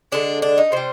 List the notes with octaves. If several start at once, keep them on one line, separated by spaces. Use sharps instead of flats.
D3 G#3 D4
D4
D#4
C3 G3 C5